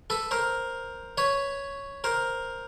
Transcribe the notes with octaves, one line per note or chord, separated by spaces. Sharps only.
A4 B4
A#4 C5
B4 C#5
A#4 C5